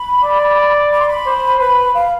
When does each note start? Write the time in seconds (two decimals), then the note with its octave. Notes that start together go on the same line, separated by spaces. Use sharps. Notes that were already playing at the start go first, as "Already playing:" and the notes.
Already playing: B5
0.23 D5
0.92 B5
1.00 C6
1.08 B5
1.26 C5
1.60 B4 B5
1.94 F5